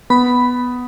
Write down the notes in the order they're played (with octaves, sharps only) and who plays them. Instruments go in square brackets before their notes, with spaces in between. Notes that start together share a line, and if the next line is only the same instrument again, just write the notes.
[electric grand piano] B3 [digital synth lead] B5